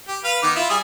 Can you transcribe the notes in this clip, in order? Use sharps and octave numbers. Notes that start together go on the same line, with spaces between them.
G4
B4 F5
D#3 B3 D6
E4 F4
G3 G#4 D#6